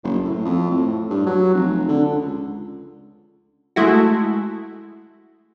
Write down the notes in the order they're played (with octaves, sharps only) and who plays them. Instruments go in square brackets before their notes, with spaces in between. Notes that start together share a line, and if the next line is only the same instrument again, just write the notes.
[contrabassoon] F#1
A2
F2
A2
G2
F#3
F1
D3
C#2
[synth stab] G#3 A3 E4 F#4